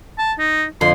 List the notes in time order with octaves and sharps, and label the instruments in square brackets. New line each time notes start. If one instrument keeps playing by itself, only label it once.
[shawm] A5
D#4
[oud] F2 D3 [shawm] C6